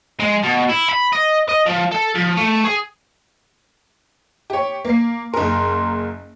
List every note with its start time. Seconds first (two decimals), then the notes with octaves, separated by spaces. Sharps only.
0.20 G#3
0.43 B2
0.69 E4
0.89 B5
1.13 D#5
1.49 D#5
1.66 F3
1.92 A4
2.15 F3
2.37 A3
2.64 G#4
4.50 G4 C#5
4.85 A#3 C7
5.34 F#1 A#4 C6